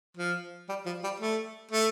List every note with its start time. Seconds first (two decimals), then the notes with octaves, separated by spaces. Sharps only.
0.17 F3
0.69 G3
0.86 F3
1.04 G3
1.20 A3
1.71 A3